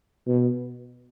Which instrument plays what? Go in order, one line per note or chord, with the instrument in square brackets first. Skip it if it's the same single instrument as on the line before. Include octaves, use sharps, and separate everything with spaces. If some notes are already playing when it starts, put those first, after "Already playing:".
[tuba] B2